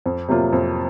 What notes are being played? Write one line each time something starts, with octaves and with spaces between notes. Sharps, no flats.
F2
C3 F#3 A#3 F4
F2